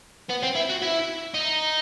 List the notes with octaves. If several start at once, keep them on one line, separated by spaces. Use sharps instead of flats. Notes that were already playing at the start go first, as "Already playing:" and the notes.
B3
C4
E4
F#4
E4
D#4